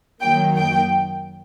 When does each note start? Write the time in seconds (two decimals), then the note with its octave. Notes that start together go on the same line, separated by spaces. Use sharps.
0.20 F#2 D#3 F#3 A#3 G5
0.56 G5